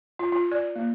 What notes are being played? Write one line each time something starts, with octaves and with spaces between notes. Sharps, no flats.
F4
F4
D5
A#3